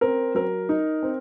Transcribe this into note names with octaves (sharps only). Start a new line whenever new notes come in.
C4 A#4
F#3 A#4
D#4
C4